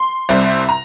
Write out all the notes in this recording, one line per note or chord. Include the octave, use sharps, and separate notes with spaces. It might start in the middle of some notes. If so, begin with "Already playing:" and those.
Already playing: C6
C2 C3 G3 C4
A#5